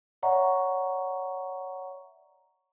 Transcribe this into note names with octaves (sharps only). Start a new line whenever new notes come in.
C#5 D5 E5 F#5 A#5 C#6